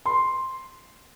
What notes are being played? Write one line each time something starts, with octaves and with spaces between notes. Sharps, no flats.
C6